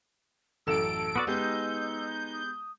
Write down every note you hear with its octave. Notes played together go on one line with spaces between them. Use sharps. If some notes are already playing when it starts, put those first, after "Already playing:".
A1 F#2 A4 E6 D7 E7
B3 F#4 D5
G#3 B3 D#4 G4 G6
D#6